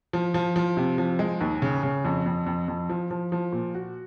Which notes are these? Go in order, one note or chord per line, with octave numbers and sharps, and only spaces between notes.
F3
F3
F3
C3
F3
G#3
D#2
C#3
C#3
F2
F2
F2
F2
F3
F3
F3
A#2
F#4